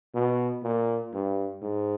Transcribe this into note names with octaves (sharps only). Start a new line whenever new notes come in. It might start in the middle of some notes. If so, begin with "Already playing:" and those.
B2
A#2
G2
G#2